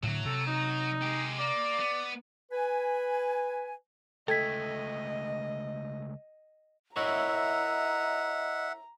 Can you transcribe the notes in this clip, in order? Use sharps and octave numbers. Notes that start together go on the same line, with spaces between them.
A2 D3 F#3
C3 A4
D#4
G#3 G4
A#3 D5
B3
B4 G#5
C#2 A3 A4 D#5 G5 G#6 B6
E4 A#4 C#5 D#5 E5 F#5 A#5